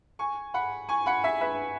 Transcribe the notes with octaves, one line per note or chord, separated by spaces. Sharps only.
G#5 C#6
F#5 B5
G#5 C#6
F#5 B5
E5 G#5
B4 E5